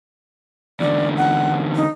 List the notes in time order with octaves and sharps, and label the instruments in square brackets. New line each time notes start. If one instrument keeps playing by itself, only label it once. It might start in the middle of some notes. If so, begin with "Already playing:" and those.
[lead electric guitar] E2 D3 [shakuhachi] D5
[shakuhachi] F#5
D#4